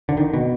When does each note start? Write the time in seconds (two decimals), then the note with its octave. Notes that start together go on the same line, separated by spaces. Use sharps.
0.09 D3
0.17 D#3
0.34 B2